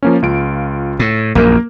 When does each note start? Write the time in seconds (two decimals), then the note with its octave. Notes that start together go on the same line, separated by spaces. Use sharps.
0.03 F3 A#3 C#4
0.22 C#2 F4 D7
0.99 A2
1.35 A#1 F#2 A#3 A#4